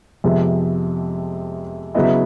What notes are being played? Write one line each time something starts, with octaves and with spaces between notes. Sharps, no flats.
F2 C3 F3 G#3 B3 E5
C#3 F#3 B3 E4 D#5
E5